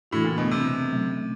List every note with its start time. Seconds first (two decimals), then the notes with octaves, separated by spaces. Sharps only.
0.11 A2 C#3 E3 A3 D4 F#4
0.25 A#2
0.38 B2
0.51 C3
0.90 B2 F#3 A3 C#4